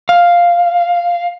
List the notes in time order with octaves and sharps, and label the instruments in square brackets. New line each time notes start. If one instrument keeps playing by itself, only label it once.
[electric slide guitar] F5